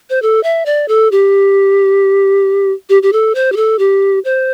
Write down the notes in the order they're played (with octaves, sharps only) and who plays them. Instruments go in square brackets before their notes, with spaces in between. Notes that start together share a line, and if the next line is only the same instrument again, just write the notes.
[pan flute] C5
A4
E5
D5
A4
G4
G4
G4
A4
C5
G4
A4
G4
C5